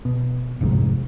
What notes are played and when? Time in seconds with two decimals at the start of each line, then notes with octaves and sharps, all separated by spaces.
0.05 B2
0.61 G1 C2 F2 G#2